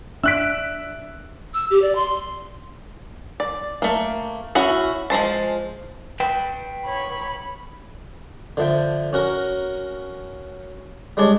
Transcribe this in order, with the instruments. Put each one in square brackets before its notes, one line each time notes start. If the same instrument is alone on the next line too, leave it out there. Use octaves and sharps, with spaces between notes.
[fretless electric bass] D4 [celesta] E5 D7 [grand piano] E6 F#6 B6
[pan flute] E6
G4
D5
C6
[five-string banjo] D5
A3 A#3
C#4 E4 F#4
F3 G#3 C5 A5
[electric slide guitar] B4 G5
[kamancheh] C#5 B5
[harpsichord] D3 F3 E5 G5
C#4 F#4 A#4
G3 G#3 D4 C#5